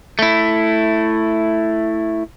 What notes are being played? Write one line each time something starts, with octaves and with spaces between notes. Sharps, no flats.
A3 E4